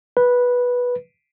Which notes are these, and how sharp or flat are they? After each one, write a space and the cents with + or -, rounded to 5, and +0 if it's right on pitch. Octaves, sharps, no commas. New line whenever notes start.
B4 -10